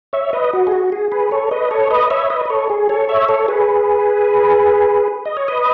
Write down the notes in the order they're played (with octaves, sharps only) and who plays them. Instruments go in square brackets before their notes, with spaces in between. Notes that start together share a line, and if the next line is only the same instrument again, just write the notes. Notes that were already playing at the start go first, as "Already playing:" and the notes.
[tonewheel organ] C#5 E5
B4 D#5
F#4
G#4
F#4
G#4
G#4 B4
A4 C#5
B4 D#5
A4 C#5
B4 D#5
C#5 E5
B4 D#5
B4
A4 C#5
G#4
A4 C#5
C#5 E5
A4 C#5
G#4 B4
D#5
C#5
B4 D#5